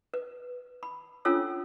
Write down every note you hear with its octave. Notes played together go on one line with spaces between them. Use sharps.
B4
B5
C#4 D4 F4 A4 C#5 E6